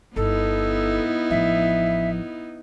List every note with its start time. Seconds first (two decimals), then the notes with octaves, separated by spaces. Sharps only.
0.16 G1 B3 D#4 E4 A4
1.30 A1 F3 E5